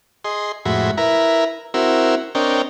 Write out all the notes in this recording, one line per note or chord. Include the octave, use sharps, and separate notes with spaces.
G#4 D#5 C6
F2 A2 G#3 F#4 E5 B5
E4 A#4 B4 E5 A#5
C4 E4 F#4 A#4 E6
C4 D4 A#4 C#5 D#5 G5